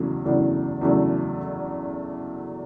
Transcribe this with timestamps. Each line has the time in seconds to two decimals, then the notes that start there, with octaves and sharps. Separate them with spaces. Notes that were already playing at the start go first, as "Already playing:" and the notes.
Already playing: E2 C#3 F#3 A3
0.25 E2 C#3 F#3 A3 D4
0.81 E2 C#3 F#3 A3 D4